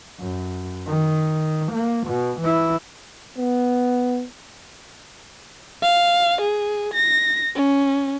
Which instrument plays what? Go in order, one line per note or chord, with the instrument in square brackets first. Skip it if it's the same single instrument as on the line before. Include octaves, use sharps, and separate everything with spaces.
[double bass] F#2
D#3
A#3
B2
E3 E4
[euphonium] B3
[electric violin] F5
G#4
A#6
C#4